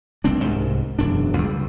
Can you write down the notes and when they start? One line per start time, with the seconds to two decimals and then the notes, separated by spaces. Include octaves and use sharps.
0.24 F1 C2 C4 D4
0.44 C2 G#2
0.99 E1 F#2 D4
1.38 C#2 G3